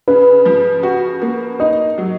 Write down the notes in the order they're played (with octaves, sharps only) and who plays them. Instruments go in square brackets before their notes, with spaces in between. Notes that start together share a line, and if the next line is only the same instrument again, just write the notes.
[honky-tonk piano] C#3 [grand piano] B4
[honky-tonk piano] F3
F#4
A#3
[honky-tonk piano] D#4 [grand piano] D#5
[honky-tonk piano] F#3